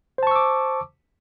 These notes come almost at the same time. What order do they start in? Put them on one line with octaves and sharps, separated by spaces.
C5 A5 C#6 E6 D6